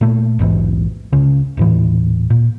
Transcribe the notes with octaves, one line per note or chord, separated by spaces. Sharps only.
A#2 A3
A#1 E2 G#2 E3
C#2 C#3 C#4
D#1 A2 E3
A#2